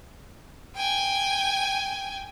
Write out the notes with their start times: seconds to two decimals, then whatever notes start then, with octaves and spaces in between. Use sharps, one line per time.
0.76 G5 G#5